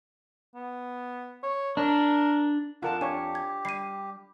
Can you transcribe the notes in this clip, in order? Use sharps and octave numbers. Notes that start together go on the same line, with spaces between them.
B3
C#5
D4 A#4
F2 D4 F4 A#4 F#5 A5
D4 G4 C#5 G#5
G#6
G3 C7 D#7